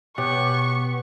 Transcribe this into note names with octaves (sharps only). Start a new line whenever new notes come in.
B2 B3 G4 C#5 C#6 F#6